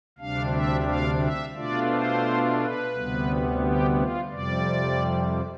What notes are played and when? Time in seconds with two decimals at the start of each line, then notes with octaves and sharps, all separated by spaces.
0.19 D2 C3 G3 D4 F5
0.53 E5
0.87 F5
1.21 E5
1.55 B2 A3 D4 F4 D5
1.90 C5
2.59 B4
2.94 D2 C3 G3 B3
3.62 G4
3.96 F4
4.31 F2 C3 G3 D5